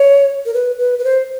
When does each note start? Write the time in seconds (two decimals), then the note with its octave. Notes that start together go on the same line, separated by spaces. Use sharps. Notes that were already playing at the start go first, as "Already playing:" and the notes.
Already playing: C#5
0.46 A#4
0.54 B4
0.79 B4
0.99 B4
1.04 C5